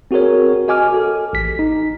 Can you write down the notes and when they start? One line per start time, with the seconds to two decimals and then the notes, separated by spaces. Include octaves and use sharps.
0.11 C4 F#4 G#4 A#4 C#5
0.68 F#4 D#5 G#5 D6 F6
0.94 A4
1.33 A1 B6
1.59 D#4